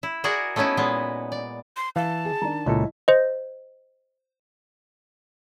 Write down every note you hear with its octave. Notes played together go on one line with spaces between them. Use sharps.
E4
F#4 G#4 A#4 D5 F#5
A3 B3 C#4 D#4 E4
A#2 G#3 B3
D5
C6
E3 F5 A5
G#4
D#3 D4 A#5
C#2 A#2 E4 A4 D#5
C5 D#5